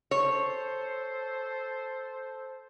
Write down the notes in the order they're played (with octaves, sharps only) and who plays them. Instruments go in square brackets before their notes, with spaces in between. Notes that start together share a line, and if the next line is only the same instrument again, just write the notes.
[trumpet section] A4 C5 [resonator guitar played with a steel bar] C#5